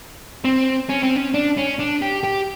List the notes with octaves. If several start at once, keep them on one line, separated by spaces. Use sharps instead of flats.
C4
C#4
C4
C#4
D4
C#4
D4
G4
G4